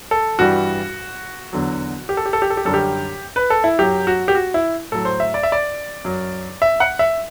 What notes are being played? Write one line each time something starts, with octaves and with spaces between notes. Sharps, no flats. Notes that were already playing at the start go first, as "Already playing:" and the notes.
A4
G2 E3 G3 F#4
E2 D3 F#3
G4
A4
G4
A4
G4
A4
G4
F#2 D3 G3 A4
G4
B4
A4
E4
F#2 F#3 G4
F#4
G4
F#4
E4
A2 F#3 A4
C5
E5
D5
E5
D5
F#2 F#3
E5
F#5
E5